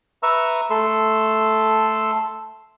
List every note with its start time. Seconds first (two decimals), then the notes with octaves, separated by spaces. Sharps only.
0.23 B4 E5 A#5 C#6 E6
0.70 A3 A4 C6 E6